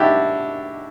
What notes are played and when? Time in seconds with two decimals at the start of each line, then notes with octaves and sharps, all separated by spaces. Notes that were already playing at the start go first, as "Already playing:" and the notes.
Already playing: D4 E4 F#4 G4